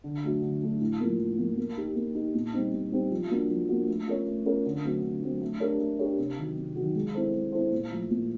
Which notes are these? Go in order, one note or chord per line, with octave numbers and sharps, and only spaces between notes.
D3
F#3 A3 D4 F#4
D3
F#3 A3 D4 F#4
A2
F3 A#3
A2
F3 A#3
A#3
D#4 G4
A#3
D#4 G4
A#2
G3 C4 D#4
A#2
G3 C4 D#4
F3
A#3 D4 F#4
F3
A#3 D4 F#4
A3
C#4 F4 A#4 C#5
A3
C#4 F4 A#4 C#5
D3
F#3 A3 C4
D3
F#3 A3 C4
A3
D4 G4 A#4 C#5
A3
D4 G4 A#4 C#5
C3
D#3 F#3
C3
F#3
D#3
G#3
C4 E4 A4 C5
G#3
C4 E4 A4 C5
A#2
F3 A3
A#2